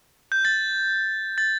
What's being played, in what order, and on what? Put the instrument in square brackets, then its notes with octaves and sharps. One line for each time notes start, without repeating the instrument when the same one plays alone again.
[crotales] G6
A6
A6